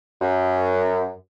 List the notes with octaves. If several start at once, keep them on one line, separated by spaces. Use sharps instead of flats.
F#2